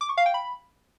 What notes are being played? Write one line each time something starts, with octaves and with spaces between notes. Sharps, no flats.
D6
C#6
F5
G5
B5